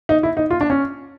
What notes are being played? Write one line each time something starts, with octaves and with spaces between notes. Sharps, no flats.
D#4
E4
D#4
F4
D4
C#4